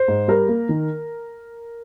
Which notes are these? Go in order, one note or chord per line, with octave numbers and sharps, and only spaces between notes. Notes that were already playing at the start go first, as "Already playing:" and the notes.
Already playing: C5
G#2
G3 A#4
A#3
D#3